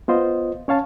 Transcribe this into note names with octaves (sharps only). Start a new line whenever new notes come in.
B3 F4 C5 D#5
C#4 C#5 F5 A5